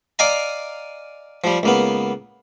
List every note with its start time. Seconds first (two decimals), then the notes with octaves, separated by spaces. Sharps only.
0.19 D5 D#5 F5 G#5 A#5
1.44 F3 G3
1.63 C#2 A#3 B3